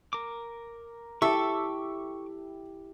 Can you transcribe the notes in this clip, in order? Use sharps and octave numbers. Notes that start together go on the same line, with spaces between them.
A#4 D6
E4 G4 A4 E5 C#6 D6